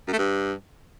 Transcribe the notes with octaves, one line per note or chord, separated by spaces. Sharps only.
F#2
A3
G2